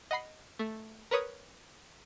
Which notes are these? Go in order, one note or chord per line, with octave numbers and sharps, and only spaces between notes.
D#5 F#5 B5 C7
A3
A#4 B4 C#5 D#6